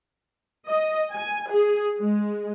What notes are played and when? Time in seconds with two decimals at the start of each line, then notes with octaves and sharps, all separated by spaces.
0.67 D#5
1.13 G#5
1.50 G#4
1.98 G#3